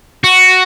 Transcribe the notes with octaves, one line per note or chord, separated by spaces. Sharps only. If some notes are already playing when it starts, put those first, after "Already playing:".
F#4